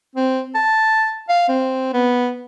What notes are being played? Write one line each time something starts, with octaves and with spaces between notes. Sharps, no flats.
C4
A5
F5
C4
B3